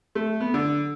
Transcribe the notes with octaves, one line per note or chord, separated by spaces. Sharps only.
A3
B3
D3